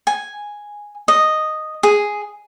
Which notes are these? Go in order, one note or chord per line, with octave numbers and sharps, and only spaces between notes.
G#5
D#5
G#4